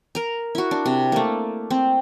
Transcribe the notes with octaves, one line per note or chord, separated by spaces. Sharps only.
A#4 A#5
E4 F#4
D4
C3
A3 A#3
C4